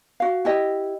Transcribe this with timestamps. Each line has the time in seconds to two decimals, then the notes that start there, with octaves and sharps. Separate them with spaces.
0.20 F#4 F5
0.45 E4 G4 D#5